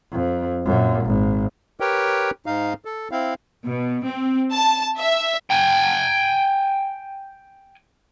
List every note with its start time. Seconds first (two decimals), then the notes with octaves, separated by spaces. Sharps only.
0.12 F2
0.65 F#2 A#2
1.05 G#1
1.80 G4 A#4 B4 C#5 G5
2.46 G#2 D#4 F5
2.85 A4
3.11 C4 E4 F5
3.65 B2
4.04 C4
4.52 A5
4.98 E5
5.51 G5 G#5